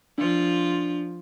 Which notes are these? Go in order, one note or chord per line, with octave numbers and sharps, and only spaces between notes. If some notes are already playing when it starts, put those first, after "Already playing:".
F3 D4 F4